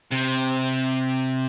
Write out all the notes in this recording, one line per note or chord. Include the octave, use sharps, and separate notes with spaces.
C3